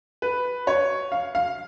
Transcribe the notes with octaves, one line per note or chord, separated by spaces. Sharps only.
B4
C#5
F5
F5